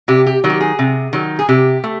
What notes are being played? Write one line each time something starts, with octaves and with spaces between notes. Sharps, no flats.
C3 G4
G4
D#3 F#3
G4
G#4
C3
D#3 F#3
G#4
C3 G4
A3